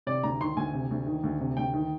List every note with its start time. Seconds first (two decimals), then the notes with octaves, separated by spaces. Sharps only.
0.07 C3 D5
0.23 D2 A#5
0.40 D#3 C6
0.57 D2 G#5
0.74 C3
0.91 D2
1.07 D#3
1.23 D2
1.40 C3
1.57 D2 G5
1.74 D#3